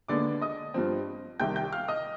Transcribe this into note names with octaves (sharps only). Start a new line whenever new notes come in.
D#2 D3 G#3 B3 D5 D6
D#5 D#6
G2 F3 C4
C2 C3 D#3 G5 G6
G5 G6
F5 F6
D#5 D#6